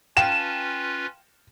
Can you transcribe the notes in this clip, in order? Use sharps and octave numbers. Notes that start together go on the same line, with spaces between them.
C#4 F4 B4 F5 G5 A5 E7